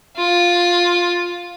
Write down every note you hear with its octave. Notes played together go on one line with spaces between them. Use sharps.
F4